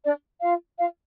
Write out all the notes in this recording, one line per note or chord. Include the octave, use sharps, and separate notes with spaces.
D4 D5
F4 F5
F4 F5